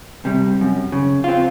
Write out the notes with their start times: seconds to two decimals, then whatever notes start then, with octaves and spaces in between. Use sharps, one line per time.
0.25 C3 G3
0.61 F#2
0.92 C#3
1.24 C4 F4